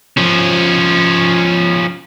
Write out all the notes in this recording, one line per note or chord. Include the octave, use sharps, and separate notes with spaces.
F3 C#4